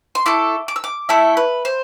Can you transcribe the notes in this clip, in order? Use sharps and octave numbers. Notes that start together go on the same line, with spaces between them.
C6
A3 E4 A4 D6
D6
E6
D6
A3 E4 A4 E5
B4
C5